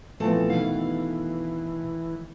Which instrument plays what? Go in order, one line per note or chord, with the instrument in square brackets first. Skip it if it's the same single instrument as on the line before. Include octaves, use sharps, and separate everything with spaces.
[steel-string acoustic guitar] A#2 C4 A4 [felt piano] E3 F3 B3 [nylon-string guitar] A3
[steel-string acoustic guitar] B2 F5 [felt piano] D#3 [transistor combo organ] E3